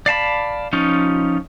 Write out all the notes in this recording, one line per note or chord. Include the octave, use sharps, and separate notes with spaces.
D5 F5 A5 B5
F3 C#4 D#4 F4